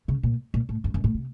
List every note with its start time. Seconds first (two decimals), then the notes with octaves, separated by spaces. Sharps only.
0.08 C#3
0.23 A#2
0.54 A#2
0.69 A2
0.84 F#2
0.94 F#2
1.04 A2
1.14 C3